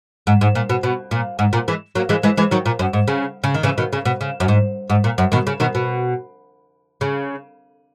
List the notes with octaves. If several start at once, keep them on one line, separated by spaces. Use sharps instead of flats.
G#2
G#2
A#2
B2
B2
A#2
G#2
A#2
E3 G#3
F#3 A#3
E3 G#3
E3 G#3
E3 G#3
D#3 F#3
A#2
F#2
G#2
C#3
C#3
D#3
C#3 E3
B2 D#3
C#3
B2
C#3
F#2
G#2
G#2
A#2
F#2
B2 D#3
C#3
B2 D#3
B2
C#3